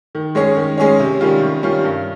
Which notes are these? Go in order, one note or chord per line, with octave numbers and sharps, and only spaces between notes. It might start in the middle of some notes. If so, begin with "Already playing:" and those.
D#3
G#3 C#4 G#4 C#5
D#3
G#3 C#4 G#4 C#5
C3
D#3 G3 C#4 F4
C3
D#3 G3 C#4 F4
G2